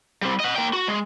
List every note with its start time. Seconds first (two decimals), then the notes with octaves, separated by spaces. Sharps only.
0.22 G3 C4
0.40 D#5 F#5
0.56 A#3 G5
0.73 F#4
0.88 G#3